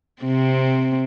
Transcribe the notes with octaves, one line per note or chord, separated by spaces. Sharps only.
C3 C4